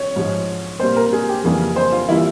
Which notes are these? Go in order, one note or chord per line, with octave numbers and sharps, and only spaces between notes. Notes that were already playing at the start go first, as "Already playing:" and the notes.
Already playing: C#5
G#2 F3 G#3
A#2 G3 A#3 C5
A#4
G#4
G4
F2 C#3 E3 G3 A#3 G#4
C5
F4
E3 G3 A#3 E4